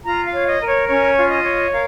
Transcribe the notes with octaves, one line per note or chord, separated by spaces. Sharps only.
F4 A#5
F5
C#5
D#5
A#4
C#5
C#4 C#5
F4
D#5
C#5
A#4 F5